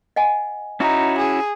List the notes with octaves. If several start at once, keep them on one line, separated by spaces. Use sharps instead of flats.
D#5 F#5 G#5
C#4 D#4 E4 F#4
G#4